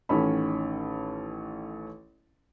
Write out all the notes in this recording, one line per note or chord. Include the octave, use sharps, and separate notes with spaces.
A1 D#3 C#4 A4 B5